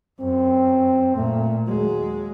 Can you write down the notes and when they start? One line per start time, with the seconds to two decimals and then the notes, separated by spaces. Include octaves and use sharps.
0.20 F#2 C4
1.16 A#2 A3
1.67 D#2 F#3 G#3